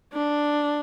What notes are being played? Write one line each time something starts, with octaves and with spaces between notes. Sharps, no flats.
D4